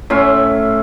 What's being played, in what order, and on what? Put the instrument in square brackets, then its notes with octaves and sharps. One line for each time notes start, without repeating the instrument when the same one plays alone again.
[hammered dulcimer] A2 C#4 E5 C6